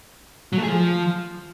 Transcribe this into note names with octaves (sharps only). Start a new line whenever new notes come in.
F#3
A3
G#4
F3